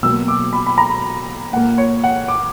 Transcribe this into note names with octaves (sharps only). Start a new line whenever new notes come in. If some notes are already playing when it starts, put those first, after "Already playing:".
B2 F#3 A#3 E6
D6
B5
B5
A#5
A#2 A#3 F#5
C#5
F#5
D6